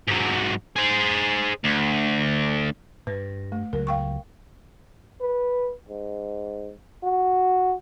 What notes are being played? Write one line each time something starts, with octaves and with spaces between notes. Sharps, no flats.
G#2 F#3
G#4 C5
D2
G2 B4
A3
C#2 F#3 A#4
F5 G5 C#6
B4
G#2
F#4